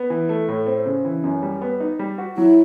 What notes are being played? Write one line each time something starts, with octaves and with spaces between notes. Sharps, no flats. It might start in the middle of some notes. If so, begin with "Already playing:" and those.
Already playing: B3
E3
A3
A2
C4
C#3
E3
F#2
G3
B3
D#4
G3
F#4
F#3 E4